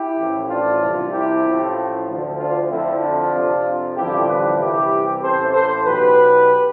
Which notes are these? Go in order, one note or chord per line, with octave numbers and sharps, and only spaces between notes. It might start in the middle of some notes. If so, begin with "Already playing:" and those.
Already playing: E4 G4
A1 A2 F3
D4 F4
C2 C3 F3
E4 G4
A1 A2 F3
D2 D3 F3
D4 F4
F2 D3 F3 C4 E4
D4 F4
F2 C3 F3
A1 G2 D3 F3 E4 G4
G4 B4
C2 C3 E3 E4 G4
A1 A2 E3 A4 C5
A4 C5
B1 B2 G4 B4